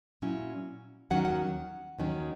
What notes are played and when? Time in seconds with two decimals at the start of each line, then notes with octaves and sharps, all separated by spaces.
0.22 A#2 F#3 C#4 E4
1.10 D#2 D#3 F#3 C#4 F#5
1.25 F#5
1.99 D#2 D#3 F#3 C#4